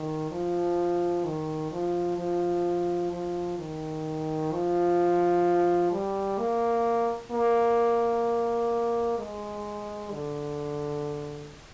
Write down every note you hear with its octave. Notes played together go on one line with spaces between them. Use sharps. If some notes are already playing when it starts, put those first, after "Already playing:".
Already playing: D#3
F3
D#3
F3
F3
F3
D#3
F3
G3
A#3
A#3
G#3
D3